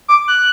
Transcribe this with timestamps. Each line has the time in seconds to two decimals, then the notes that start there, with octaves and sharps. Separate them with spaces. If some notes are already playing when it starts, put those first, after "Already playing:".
0.08 D6
0.28 F#6